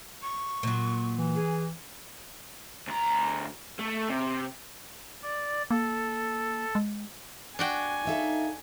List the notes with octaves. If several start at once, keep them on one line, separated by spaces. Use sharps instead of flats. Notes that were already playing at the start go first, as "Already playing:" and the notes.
C#6
A#2 F#3
E3
G#4
D2 A#5
A3
C3
D5
A#3 A4
G#3
D4 F#4 G5 G#5
D#4 A4 E5 F5